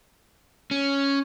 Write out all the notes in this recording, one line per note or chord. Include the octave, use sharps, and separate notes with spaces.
C#4